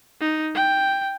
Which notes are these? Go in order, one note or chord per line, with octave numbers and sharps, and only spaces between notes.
D#4
G5